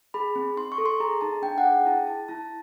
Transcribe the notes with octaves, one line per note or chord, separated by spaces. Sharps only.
G#4 B5
C4
D#4 C6
C#6
A4
C6
G#4 A#5
D#4 A5
D4 G5
F#5
G#4
G5
E4 A5
E4 A5
E4 A5